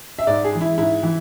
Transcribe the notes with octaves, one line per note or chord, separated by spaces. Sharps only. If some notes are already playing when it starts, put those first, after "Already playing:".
E5
G#2 D5
G#4
E3 G#3
E4
G#2 E4
E3